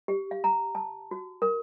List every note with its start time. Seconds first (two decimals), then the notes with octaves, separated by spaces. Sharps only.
0.08 G4
0.31 F5
0.44 A#5
0.75 A5
1.11 F#4
1.42 A#4